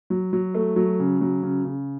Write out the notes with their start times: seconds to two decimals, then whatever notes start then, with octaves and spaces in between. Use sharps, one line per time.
0.10 F#3
0.33 F#3
0.54 A3
0.76 F#3
0.99 C#3
1.21 F#3
1.43 C#3
1.65 C#3